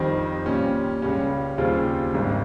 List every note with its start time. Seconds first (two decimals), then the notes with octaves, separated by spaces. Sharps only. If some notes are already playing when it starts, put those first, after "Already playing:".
Already playing: F2 D#3 G3 C4
0.46 A#2 G3 C#4 F4
1.02 C#2 C#3 G3 C#4
1.58 D#2 C#3 G3 C4 F4
2.14 G#1 G#2 G3